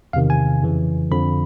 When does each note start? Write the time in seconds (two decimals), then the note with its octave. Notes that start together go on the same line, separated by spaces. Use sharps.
0.13 E2 C3 D#3 F5
0.30 G#5
0.63 F2 C#3 E3
1.11 F2 D3 F3 B5